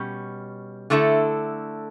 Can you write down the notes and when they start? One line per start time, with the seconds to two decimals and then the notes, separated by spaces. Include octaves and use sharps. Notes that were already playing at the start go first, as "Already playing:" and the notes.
Already playing: B2 G3 C#4
0.90 D3 A3 E4 A4